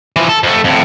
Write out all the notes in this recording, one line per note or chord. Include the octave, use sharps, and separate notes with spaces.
E3 F3
A4
F2 A3
F2 A2